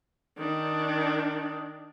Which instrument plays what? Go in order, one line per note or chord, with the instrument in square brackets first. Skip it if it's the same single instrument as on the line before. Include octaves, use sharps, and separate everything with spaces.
[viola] D#3 D4